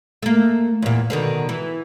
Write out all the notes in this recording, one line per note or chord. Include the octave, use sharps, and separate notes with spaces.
A3 A#3
E2 A#2
B2 D3 D#3
E3